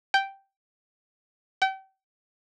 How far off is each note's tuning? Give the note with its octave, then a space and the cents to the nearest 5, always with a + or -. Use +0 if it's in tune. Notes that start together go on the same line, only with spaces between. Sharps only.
G5 -5
G5 -35